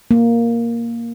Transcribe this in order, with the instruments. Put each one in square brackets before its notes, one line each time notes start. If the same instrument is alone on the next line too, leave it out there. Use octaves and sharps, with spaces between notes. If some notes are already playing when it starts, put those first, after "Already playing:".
[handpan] A#3